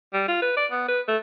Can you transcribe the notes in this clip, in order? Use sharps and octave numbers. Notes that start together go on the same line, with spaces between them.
G3
F4
B4
D5
B3
B4
A3